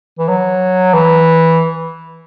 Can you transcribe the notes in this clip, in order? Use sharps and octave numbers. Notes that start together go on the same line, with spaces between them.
E3
F#3
E3